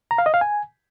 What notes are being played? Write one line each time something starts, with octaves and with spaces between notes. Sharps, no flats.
A#5
F5
D#5
F5
G#5